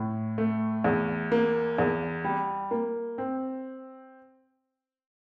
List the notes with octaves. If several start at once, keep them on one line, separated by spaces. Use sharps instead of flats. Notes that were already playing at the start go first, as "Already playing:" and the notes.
Already playing: A2 A3
A3
E2
A#3
E2
G3
A#3
C4